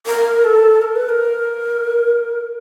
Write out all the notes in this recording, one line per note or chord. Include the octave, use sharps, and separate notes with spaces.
A#4
A4
A#4
B4
A#4